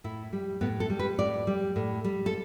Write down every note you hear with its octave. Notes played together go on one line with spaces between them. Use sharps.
A2 E4
G3
A2 B3
A4
G3
B4
A2 D5
G3
A2
G3
A4